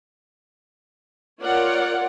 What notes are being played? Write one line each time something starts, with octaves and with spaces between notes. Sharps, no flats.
F4 A#4 C#5 D5 F#5